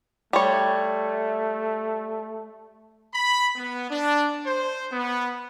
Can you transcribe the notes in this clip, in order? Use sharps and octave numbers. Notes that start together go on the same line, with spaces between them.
G3 A3 C#5
B5
B3
D4
C5
B3